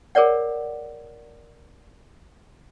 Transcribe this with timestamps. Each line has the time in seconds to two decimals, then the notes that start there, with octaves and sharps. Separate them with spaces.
0.15 G#4 A#4 C#5 D5 F#5